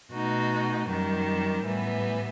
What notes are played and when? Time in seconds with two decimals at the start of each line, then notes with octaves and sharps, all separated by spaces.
0.12 B2 A3 D#4 F#4
0.88 F#2 D#3 G3
1.63 A2 E3 G3 B3